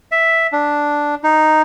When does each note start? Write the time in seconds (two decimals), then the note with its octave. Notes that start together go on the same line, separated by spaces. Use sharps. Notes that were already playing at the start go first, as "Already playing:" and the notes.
0.12 E5
0.52 D4
1.24 D#4